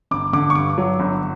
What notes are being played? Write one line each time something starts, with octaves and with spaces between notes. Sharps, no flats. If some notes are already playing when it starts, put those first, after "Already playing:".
G1 D6
D3 D6
C#6
G2 D6
F#3
G1